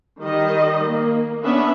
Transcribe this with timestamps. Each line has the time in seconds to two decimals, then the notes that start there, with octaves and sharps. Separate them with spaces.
0.21 D#3 G3 D#5
0.85 A#3
1.43 B3 C#4 D4 E5